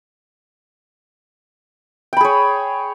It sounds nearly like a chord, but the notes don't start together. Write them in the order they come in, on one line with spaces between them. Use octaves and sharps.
G5 B5 G#4 C#5